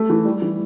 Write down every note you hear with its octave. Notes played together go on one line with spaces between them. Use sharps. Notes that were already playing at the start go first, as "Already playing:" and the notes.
Already playing: A3
E3
G3
E3